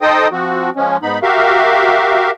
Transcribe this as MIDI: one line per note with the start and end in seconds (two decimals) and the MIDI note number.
0.02 0.28 63
0.02 0.28 69
0.02 0.28 72
0.02 0.28 75
0.02 0.28 79
0.02 0.28 87
0.32 0.70 53
0.32 0.70 60
0.32 0.70 66
0.76 0.97 53
0.76 0.97 56
0.76 0.97 61
1.03 1.19 44
1.03 1.19 59
1.03 1.19 63
1.03 1.19 83
1.22 2.31 66
1.22 2.31 67
1.22 2.31 70
1.22 2.31 76
1.22 2.31 77